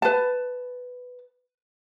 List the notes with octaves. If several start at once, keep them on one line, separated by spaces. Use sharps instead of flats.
B4 A5